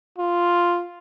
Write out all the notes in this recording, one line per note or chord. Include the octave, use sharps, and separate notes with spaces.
F4